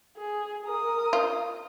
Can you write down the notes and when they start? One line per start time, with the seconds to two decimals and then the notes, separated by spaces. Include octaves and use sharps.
0.17 G#4
0.65 A#4 D#6
1.13 F4